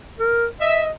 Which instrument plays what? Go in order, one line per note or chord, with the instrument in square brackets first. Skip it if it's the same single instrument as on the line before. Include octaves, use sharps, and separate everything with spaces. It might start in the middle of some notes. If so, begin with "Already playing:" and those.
[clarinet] A#4
[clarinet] D#5 [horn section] E5